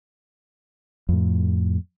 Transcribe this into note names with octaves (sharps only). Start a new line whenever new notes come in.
F2 A2